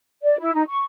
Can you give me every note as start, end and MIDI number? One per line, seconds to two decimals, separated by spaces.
0.23 0.38 74
0.39 0.54 64
0.54 0.63 63
0.67 0.83 85